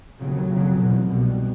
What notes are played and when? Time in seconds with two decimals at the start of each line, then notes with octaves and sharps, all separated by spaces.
0.20 F1 D#2 C#3 F#3
0.50 F#1 F2 C#3
0.79 F1 E2 B2
1.09 C2 B2